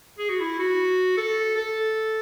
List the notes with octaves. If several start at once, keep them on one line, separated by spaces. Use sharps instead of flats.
G#4
F#4
E4
F#4
A4
A4